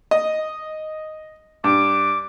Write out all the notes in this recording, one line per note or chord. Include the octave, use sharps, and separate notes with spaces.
D#5
G2 D6